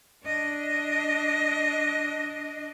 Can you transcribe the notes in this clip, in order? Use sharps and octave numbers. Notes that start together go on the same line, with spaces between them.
D4 D#5